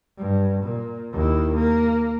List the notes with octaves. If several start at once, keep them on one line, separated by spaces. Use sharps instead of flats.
G2
A#2
D#2 E4
A#3